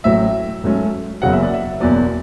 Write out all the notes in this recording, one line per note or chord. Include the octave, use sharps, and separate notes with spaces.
A1 A2 F#3 E5
G#2 F#3 A3 C#4
F#1 E2 C#3 F#3 F#5
E5
D5
E5
F#1 E2 B2 F#3 D5